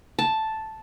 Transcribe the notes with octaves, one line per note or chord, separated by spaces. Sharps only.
A5